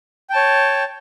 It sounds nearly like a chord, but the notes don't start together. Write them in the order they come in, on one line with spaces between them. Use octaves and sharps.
G5 A5 C#5